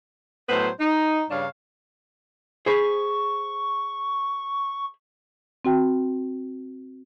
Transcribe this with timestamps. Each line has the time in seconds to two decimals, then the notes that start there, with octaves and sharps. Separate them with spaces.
0.49 A2 F#3 B3 C5
0.79 D#4
1.30 G2 C#3 D4 C#5 F5
2.66 G#4 C5 B5 C#6
5.65 C4 F#4 G5